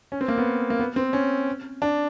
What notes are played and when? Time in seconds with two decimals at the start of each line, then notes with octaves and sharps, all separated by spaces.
0.12 C#4
0.21 C4
0.28 A#3
0.38 B3
0.70 A#3
0.80 B3
0.96 C4
1.13 C#4
1.82 D4